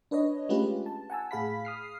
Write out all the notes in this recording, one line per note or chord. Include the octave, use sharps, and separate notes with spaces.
D4 B4 C#5 D#5
G#3 A3 C#4 F4 G4 B4
A5
F#5 G#5 A5 E6
A2 G#4 F5 B5 B6
D#6 F6 C7